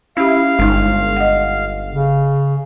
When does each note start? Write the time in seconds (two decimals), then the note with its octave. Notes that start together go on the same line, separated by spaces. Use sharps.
0.17 C#4 E4 G4 F5
0.59 G1 G#3 D#4
1.16 D#5 F#5
1.90 C#3